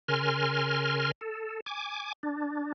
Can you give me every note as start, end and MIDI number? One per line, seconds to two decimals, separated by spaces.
0.08 1.11 49
0.08 1.11 70
0.08 1.11 80
0.08 1.11 84
0.08 1.11 89
1.21 1.60 69
1.66 2.13 80
1.66 2.13 86
2.23 2.72 62